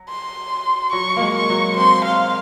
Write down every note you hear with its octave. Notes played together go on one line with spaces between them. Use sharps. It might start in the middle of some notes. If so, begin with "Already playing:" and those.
Already playing: F#3
C6
F#3 C#6
A#3
G#3
C#6
F#3
C4 C6
C4 F5